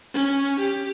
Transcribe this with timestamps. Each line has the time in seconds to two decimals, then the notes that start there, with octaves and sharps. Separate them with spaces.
0.14 C#4
0.60 G4